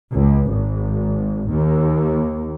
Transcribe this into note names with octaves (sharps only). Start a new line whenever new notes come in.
C#2
G#1
D#2